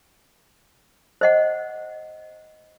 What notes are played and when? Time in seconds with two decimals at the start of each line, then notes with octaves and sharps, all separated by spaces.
1.21 C5 D#5 F#5